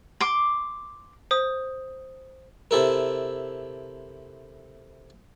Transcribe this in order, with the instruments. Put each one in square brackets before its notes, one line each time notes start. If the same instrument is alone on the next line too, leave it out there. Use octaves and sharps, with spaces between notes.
[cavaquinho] C6 D6
[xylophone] C5 D#6
[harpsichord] C3 E4 A4 A#4